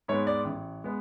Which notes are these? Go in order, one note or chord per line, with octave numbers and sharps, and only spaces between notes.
G#2 G#3 B3 C#5
D5
A1
G#3 B3